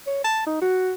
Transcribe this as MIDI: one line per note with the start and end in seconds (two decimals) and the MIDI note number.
0.07 0.20 73
0.25 0.43 81
0.47 0.60 63
0.62 0.94 66